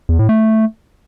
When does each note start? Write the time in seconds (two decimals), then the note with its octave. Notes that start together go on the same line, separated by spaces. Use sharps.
0.09 E2
0.19 A2
0.29 A3